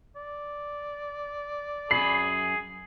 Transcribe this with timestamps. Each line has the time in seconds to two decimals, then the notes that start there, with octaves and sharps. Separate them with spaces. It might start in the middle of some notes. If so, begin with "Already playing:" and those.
0.16 D5
1.91 F#2 G#4 B5 C7